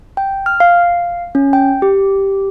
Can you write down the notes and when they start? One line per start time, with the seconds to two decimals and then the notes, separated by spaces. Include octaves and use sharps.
0.17 G5
0.46 F6
0.60 F5
1.35 C#4
1.53 G5
1.82 G4